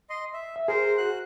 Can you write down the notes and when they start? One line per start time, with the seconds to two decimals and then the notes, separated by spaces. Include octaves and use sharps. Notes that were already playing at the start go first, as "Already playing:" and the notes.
0.10 D#5 C6
0.33 E5
0.56 E5
0.68 G#4 A#4 C5
0.98 F#4 F#6